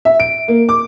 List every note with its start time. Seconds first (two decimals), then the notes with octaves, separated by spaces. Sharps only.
0.05 E5
0.20 D7
0.48 A#3
0.69 D6